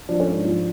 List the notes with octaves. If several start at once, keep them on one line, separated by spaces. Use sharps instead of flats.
F3 D4
C#4
G#2 D4
F3